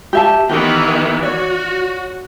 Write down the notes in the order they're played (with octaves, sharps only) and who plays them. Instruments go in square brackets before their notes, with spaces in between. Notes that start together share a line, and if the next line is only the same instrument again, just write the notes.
[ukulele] G4 E5 A5
[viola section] D#3 E3 B3 [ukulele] G4
[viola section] F#4 [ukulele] C#5 D5